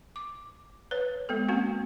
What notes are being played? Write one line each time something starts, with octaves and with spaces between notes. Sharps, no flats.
D6
B4 C#5
G#3 B3 A4
A#3 C4 C#4 F#4